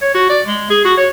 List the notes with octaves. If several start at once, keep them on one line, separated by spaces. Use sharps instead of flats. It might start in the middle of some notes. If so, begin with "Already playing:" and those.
C#5
F#4
D5
G#3
G#4
F#4
C#5